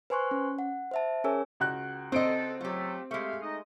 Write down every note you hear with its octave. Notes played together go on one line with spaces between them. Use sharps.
B4 C5 G#5 C6 C#6 F#6
C#4
F#5
C5 E5 A5
C#4 G#4 A#4 C#5 G#5 E6
C#2 F#4 F#6
C4 A4 C5 D#5 D7
F#3 A3 F4 G4
G#3 A3 G4 E5 F5
D#4 D#5